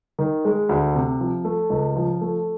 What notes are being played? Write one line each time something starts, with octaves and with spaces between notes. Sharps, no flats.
D#3
G#3
D2
C3
F3
A3
C#2
F3
A3